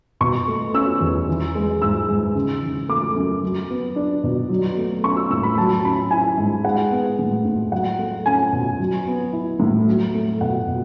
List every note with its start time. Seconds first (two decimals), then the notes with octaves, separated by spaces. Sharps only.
0.21 B2 C#6
0.47 A3
0.74 C#4 E6
1.01 E2
1.28 E3
1.55 G#3
1.82 G#2 E6
2.09 G#2
2.35 C#3
2.62 E3
2.89 A3 D6
3.16 F#2
3.43 F#3
3.70 B3
3.96 D4
4.24 B2
4.49 F#3
4.77 A3
5.04 C#4 C#6
5.17 E6
5.31 A2 E6
5.43 B5
5.58 F#3 A5
5.84 C#4 B5
6.11 E4 G#5
6.38 G#2
6.64 G#3 F#5
6.91 B3
7.19 A2
7.45 A2
7.72 F#3 F#5
7.99 A3
8.26 C#4 G#5
8.53 B2
8.79 F#3
9.07 B3
9.33 E4
9.60 A2
9.87 F#3
10.14 A3
10.41 B2 F#5
10.68 B2